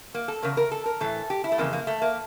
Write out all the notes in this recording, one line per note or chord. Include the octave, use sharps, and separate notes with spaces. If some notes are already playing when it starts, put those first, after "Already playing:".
A#3
A4
E2 C#3 A#4
A#4
A4
A#4
A2 E3 A4
G4
E4
A3
F2 C#3 E3 A#3
A#3
A3
A#3